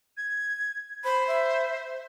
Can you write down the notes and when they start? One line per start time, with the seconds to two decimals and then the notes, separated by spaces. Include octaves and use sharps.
0.17 G#6
1.04 C5 B5
1.28 E5